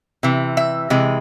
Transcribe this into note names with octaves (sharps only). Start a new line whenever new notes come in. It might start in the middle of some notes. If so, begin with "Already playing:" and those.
C3 E3
E5
C3 E3 G#3